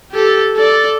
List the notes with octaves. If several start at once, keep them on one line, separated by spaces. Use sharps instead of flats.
G4 A4
A4 D5